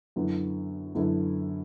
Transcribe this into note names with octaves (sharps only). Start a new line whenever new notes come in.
F#2 D3 B3 E4
F#2 D3 B3 E4